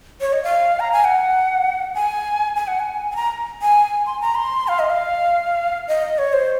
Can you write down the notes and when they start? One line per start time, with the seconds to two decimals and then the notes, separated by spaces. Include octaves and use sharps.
0.21 C#5
0.33 D#5
0.43 F5
0.80 A#5
0.93 G#5
1.04 F#5
1.95 G#5
2.56 G#5
2.67 F#5
2.79 G#5
3.11 G#5
3.16 A#5
3.62 G#5
4.06 C6
4.21 A#5
4.35 C6
4.68 F5
4.79 D#5
4.90 F5
5.88 D#5
6.18 C#5
6.33 C5